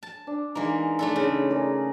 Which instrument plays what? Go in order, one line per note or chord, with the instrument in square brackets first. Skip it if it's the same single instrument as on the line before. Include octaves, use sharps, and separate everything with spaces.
[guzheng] A5
[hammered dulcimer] D4
[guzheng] E3 A#3 [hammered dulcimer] G#3 D#4
[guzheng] A3 D4 A4
C#3
[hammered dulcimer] G#4 A#4 D5